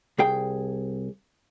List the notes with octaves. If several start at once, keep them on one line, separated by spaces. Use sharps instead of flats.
C2 G#4 G5